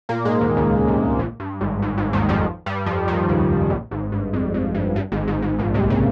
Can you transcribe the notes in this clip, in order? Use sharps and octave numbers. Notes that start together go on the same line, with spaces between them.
A#2 A#3
G#2 G#3
D#2 D#3
C#2 C#3
C2 C3
A#1 A#2
G2
G#1 G#2
G#1 G#2
G#1 G#2
D#2 D#3
F2 F3
G2 G3
F2 F3
D#2 D#3
C#2 C#3
A#1 A#2
G#1 G#2
G2
F2
F2
G2
G2
G#1 G#2
G#1 G#2
G#1 G#2
A#1 A#2
C2 C3
C#3